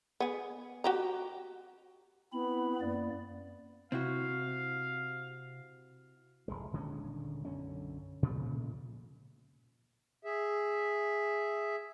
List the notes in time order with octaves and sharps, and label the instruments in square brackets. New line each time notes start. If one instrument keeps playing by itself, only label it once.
[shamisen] B3 G#4
F#4 G4 A#5
[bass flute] B3 [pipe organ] C4 E4 B5
[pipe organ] F#2 A#3 D5
[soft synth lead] C3 [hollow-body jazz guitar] C4 E4 F#4 [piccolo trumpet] F5
[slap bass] F1 B1 G#3
D#1 D3 G#3 C#4
B1 F#2 D3 C#4
A#2 C#3 F3 A3
[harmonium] G#4 E5